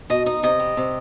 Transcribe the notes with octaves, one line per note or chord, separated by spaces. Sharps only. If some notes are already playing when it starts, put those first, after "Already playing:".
B2 D#5
D#4 D#5
C3 D#5
G3
C3